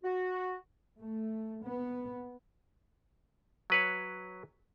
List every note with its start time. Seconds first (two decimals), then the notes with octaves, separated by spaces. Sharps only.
0.04 F#4
0.99 A3
1.65 B3
3.70 F#3 B4 C#5